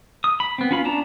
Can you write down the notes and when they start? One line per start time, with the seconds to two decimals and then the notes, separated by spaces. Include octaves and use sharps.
0.24 D#6
0.40 B5
0.58 B3 C4
0.71 C#4 F4 B5
0.84 B3 C#4 D4 A5 A#5